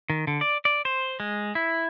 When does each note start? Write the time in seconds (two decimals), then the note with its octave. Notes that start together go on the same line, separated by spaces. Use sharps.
0.10 D#3
0.27 D3
0.41 D5
0.65 D5
0.85 C5
1.20 G#3
1.55 E4